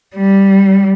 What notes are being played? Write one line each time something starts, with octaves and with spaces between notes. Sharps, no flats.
G3